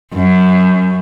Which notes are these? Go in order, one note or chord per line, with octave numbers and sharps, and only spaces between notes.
F#2